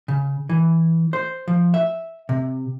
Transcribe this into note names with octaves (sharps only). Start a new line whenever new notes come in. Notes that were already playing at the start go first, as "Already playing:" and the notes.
C#3
E3
C5
F3
E5
C3